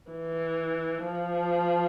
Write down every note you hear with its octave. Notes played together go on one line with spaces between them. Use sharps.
E3
F3